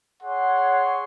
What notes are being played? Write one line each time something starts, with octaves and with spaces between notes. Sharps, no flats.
G#4 C#5 F#5 C6